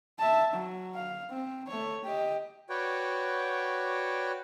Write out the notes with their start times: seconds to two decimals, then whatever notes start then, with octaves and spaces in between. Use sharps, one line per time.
0.18 E5 A5
0.53 F#3
0.95 F5
1.30 C4
1.67 A3 C#5
2.04 G4 D#5
2.70 F#4 B4 C#5 D5 G5